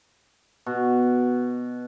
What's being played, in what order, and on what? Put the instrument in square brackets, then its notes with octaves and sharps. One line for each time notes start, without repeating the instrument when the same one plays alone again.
[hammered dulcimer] B2